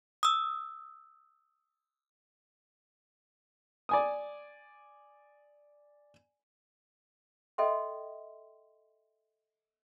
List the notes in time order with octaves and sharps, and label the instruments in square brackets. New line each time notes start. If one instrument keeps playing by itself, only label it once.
[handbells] D#6 E6
[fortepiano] D5 G#5 D#6
[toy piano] A4 D#5 E5 G5 C6